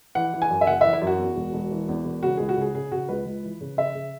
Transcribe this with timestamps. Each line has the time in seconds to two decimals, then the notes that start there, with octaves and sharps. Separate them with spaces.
0.15 E3 F#5
0.34 E3
0.42 G#5
0.50 F#2
0.61 E5
0.67 F#1 F#5
0.81 E3 E5
0.93 E4
1.02 F#2
1.07 F#4
1.19 E2
1.37 E1
1.54 E1
1.71 E3
1.89 E2
2.05 E1
2.23 C#3 F#4
2.37 C#2 G#4
2.49 F#4
2.57 C#3 G#4
2.74 C#3 G#4
2.92 C#3 F#4
3.09 C#2 B4
3.26 C#2
3.43 E3
3.61 C#3
3.77 C#3 E5
3.95 C#3